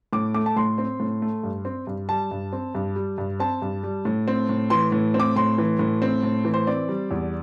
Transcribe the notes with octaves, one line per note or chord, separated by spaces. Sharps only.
A2 D6
A3 D6
A5
A2 C6
C4
A2
A3
G2
C4
G2
G3 A5
G2
C4
G2
G3
G2
C4 A5
G2
G3
A2
C4
A2
E3 C6
A2
C4
D6
A2 C6
E3
A2
C4
A2
E3
C5
C4 D5
G3
E2